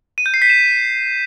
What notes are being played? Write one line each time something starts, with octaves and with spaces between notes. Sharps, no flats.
D#7
G6
C7
B6
E7